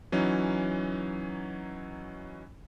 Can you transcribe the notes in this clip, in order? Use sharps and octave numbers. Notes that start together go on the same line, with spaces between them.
E3 F#3 C#4 D#4